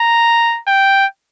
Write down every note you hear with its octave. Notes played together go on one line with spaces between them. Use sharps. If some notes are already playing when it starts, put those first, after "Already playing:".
Already playing: A#5
G5